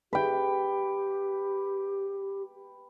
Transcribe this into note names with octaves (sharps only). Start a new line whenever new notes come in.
G4 B4 G5